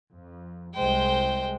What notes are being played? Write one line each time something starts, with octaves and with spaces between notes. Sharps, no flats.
F2
C2 G#3 C5 G5